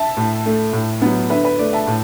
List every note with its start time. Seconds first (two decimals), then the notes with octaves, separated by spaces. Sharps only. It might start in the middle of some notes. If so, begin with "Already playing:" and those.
Already playing: E5 A5
0.17 A2
0.46 A3
0.73 A2
1.02 F#3 B3
1.30 D3 B4 E5
1.44 B4
1.59 A3 D5
1.73 E5 A5
1.87 A2